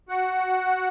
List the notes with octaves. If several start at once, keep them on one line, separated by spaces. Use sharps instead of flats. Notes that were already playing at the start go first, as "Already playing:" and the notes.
F#4 F#5